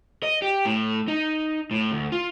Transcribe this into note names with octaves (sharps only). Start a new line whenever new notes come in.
D#5
G4
A2
D#4
A2
D2
F4